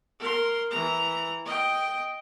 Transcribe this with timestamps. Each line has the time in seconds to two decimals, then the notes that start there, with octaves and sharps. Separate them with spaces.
0.19 A#4 C6
0.71 E3 A#5
1.45 D#5 G5